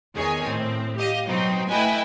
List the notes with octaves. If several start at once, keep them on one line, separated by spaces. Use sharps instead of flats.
E2 D#3 G#4 C#5 G#5
A2 C4
G4 D#5 F5
B2 F#3 C4 D#4
A3 E4 B4 D#5 G5 G#5